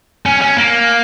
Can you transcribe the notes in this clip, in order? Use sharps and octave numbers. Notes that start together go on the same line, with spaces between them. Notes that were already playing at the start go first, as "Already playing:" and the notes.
C#4
C#4
A#3